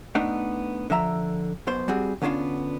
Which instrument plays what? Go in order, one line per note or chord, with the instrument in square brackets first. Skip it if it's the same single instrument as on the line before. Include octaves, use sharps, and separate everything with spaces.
[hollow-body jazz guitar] A3 B3 D4 D#4
D3 F3 E5 A#5
B1 B2 C5
G3 C4 F#4 G#4
D3 B3 C#4 D4 F4